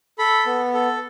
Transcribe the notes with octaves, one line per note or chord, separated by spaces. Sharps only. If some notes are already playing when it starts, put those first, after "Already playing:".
A4 B5
B3
A4